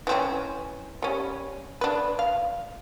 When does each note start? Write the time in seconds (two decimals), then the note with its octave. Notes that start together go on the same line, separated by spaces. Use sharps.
0.07 E3 C4 C#4
1.02 G3 C#4
1.81 D4 B4
2.19 F5